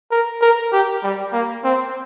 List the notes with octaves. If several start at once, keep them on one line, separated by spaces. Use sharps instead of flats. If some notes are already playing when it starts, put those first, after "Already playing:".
A#4
A#4
G4
G3
A#3
C4